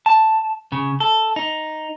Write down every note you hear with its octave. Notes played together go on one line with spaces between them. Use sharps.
A5
C#3
A4
D#4